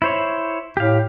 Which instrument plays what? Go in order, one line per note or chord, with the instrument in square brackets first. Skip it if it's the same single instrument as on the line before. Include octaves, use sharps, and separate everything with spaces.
[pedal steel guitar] E4 C5 C#5
[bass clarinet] A2 [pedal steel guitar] G4 F5